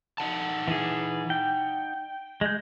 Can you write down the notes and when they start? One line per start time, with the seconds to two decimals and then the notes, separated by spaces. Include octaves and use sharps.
0.18 D#4 F#5 A5
0.68 E3 G#4
1.30 G5
2.41 G#3 G6